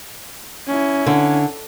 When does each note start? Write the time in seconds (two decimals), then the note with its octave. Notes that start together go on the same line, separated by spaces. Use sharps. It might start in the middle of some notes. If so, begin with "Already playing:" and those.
0.67 C#4 E4
1.06 D3